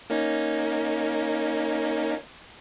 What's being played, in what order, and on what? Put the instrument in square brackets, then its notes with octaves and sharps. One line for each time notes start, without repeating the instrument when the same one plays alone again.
[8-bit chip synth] A#3 C#4 D#4